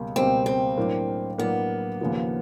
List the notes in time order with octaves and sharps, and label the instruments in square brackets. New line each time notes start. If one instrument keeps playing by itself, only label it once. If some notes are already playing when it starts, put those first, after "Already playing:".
Already playing: [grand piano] C#2 B2 G3 A#3
[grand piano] C#2 B2 G3 A#3 [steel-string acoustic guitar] C4
[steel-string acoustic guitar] C4
[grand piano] A2 F#3 A#3 D4
[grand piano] A2 F#3 A#3 D4 [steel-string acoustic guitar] B3
[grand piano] D#2 C#3 F3 A#3